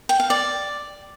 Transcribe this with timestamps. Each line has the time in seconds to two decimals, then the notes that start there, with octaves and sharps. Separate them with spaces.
0.09 G5
0.20 F5
0.30 D5